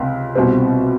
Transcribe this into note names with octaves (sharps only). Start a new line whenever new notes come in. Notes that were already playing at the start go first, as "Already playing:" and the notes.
Already playing: C#2 C3
C2 B2 G3 C4